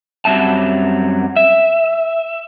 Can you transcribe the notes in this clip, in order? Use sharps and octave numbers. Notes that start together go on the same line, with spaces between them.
F#2 F#3 G3 C4 E5 A5
E5